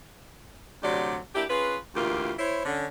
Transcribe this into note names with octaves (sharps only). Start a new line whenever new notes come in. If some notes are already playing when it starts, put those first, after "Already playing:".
D2 C3 F#3 G4 D5
A#3 D4 E4 G4
C#4 F4 G#4 B4
D2 A#2 E3 A#3 F4 G4
E4 C5 C#5
D3 C#4